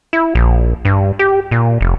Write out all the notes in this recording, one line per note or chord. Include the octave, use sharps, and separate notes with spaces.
E4
A#1
G2
G4
A#2
F1